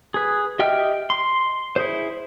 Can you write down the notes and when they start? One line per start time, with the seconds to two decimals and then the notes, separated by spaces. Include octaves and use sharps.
0.14 G#4 B4
0.59 G4 D#5 E5 G5 F6
1.10 C6
1.76 E4 G#4 C5